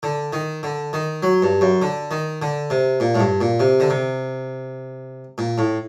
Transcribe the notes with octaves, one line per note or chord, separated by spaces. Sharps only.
D3
D#3
D3
D#3
F#3
G2
F#2
D3
D#3
D3
C3
A#2
A2
G2
A#2
C3
D3
C3
A#2
A2